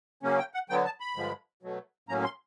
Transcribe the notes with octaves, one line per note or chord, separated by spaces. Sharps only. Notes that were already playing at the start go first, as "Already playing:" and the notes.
C#3 F#3 A#3 C#4
G5
F#5
D3 F#3 B3 G5
A5
B5
G2 D3 F3 G#3
B2 F#3 A3
A2 F#3 A#3 C#4 A#5
C6